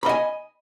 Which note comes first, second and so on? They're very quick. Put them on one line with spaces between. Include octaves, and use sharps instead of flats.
B5 D#5 G#5